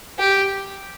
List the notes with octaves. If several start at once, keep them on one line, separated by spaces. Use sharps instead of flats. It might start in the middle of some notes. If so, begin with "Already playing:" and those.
G4